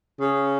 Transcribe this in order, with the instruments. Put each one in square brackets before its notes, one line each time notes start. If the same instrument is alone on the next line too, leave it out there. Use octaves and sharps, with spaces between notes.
[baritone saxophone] C#3